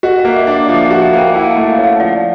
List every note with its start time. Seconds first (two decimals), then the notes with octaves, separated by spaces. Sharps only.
0.03 F#4 D#5
0.19 D#5
0.25 A#3
0.36 E5
0.47 D4
0.52 E5
0.69 F3 F5
0.85 E5
0.91 F#4
1.02 F5
1.13 A#3 G5
1.34 E4 F5
1.43 F#5
1.51 F5
1.56 A3
1.67 F5
1.78 C#4
1.84 F5
2.00 F3 D5